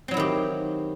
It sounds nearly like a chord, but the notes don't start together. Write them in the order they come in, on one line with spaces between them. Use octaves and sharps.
C4 F#3 E4 D#3 G4